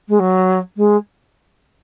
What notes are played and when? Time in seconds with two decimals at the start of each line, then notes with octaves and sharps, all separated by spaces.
0.09 G#3
0.19 F#3
0.77 G#3